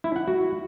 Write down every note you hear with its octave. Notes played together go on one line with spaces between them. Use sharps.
E4
F#5
F#4